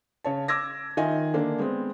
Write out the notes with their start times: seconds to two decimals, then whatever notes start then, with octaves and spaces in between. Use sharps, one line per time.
0.25 C#3 C#5 A5
0.48 D6 E6 G#6 A#6
0.97 D#3 F4 D#5 E5 G#5
1.34 D3 A#3 D4
1.59 G#3 B3 C4